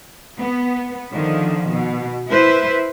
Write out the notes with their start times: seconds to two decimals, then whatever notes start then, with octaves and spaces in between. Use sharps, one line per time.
0.39 B3
1.11 D3 D#3 F3
1.71 B2
2.27 E4 B4 C5 E5